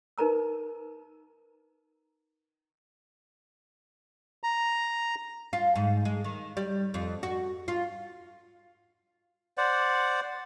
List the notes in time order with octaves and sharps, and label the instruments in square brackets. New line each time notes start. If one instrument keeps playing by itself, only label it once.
[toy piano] D#4 A#4 B4 A#5 E6
[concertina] A#5
[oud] F4
G#2
G#3
D#3
G3
F2
F#4
F4
[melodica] C5 D5 F#5